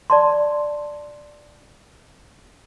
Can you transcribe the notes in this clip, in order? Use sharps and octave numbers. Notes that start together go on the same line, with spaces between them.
D5 A5 C6